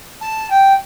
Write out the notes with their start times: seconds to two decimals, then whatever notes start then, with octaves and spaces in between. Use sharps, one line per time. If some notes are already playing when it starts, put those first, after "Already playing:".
0.21 A5
0.50 G5